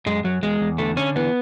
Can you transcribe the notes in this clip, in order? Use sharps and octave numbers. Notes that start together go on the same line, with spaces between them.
F#2 G#3
F#2 F#3
E2 G#3
E2
D3 A3
D3 C#4
E3 B3